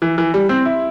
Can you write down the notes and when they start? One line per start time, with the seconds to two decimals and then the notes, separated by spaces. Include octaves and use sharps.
0.02 E3
0.18 E3
0.34 G3
0.49 C4
0.65 E4